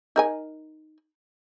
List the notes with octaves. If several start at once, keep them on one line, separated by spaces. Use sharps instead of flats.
D#4 A#4 G#5